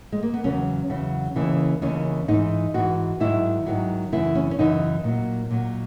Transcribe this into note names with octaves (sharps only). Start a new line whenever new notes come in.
G#3
A#3
B3
E2 C#3 F#3 C#4
E2 C#3 F#3
D#2 C#3 E3
D#2 C#3 E3 C#4
G#2 E3 D#4
G#2 E3 F#4
G#2 D#3 F#3 E4
G#2 D#3 F#3
F#2 C#3 E3 E4
C#4
C#4
F#2 C#3 E3 D#4
A#2 F#3
A#2 F#3